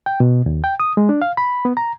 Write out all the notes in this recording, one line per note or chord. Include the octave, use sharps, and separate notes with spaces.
G5
B2
D#2
G5
D#6
G#3
D4
F5
B5
B3
A#5